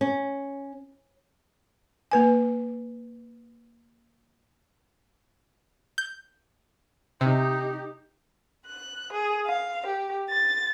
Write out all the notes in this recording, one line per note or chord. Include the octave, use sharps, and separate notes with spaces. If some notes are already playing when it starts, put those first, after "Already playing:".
C#4
A#3 B4 G#5
G6
C3 D#4 G4
F#6
G#4
F5
G4
A6